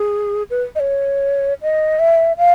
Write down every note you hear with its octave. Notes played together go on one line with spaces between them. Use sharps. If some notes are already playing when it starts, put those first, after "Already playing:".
Already playing: G#4
B4
D#5
C#5
D#5
E5
F5